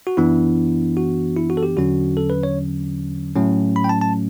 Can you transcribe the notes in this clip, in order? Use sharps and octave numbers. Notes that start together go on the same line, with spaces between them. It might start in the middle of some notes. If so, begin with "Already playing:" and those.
F#4
F#2 E3 B3 D4 E4
F#4
E4
F#4
A4
G4
E2 D3 F#3 C#4 F#4
A4
B4
C#5
A2 F#3 A3 C#4
B5
G5
A5
A5